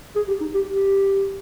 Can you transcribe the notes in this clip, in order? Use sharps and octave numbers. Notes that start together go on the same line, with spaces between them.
G#4
G4
D#4
G4
G4